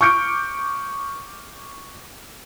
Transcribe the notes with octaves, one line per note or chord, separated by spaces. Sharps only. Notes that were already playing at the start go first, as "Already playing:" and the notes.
C#6 D6 F6 G6 C#7 D7